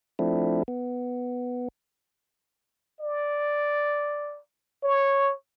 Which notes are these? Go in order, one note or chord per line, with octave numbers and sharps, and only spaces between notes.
F3 A3 C4 D4 E4
B3
D5
C#5